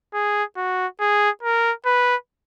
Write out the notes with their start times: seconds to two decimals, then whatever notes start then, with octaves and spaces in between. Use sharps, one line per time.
0.14 G#4
0.57 F#4
1.00 G#4
1.43 A#4
1.86 B4